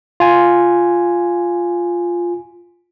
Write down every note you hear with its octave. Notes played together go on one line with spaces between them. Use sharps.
F4 G#5